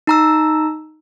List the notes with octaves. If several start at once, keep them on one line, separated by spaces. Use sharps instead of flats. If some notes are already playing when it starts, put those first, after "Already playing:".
D#4 A#5 E6